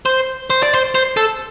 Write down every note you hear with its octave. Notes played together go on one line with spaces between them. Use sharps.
C5
C5
D5
C5
C5
A4